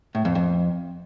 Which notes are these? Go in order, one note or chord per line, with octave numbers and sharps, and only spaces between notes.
A2
F2
F2